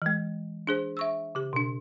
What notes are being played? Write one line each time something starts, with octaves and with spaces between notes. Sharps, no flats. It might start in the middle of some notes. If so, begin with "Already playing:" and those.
E3 G#3
D4 G#4 C5
E5 C#6 E6
C#3 G4
B2 D4